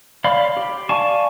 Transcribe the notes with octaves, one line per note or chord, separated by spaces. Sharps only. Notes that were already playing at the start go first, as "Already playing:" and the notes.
C#5 D5 F5 B5 C6
G4
D5 F5 G#5 A5 C#6